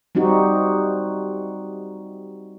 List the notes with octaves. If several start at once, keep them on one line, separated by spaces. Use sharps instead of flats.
G3 C4 D#4 F#4 G4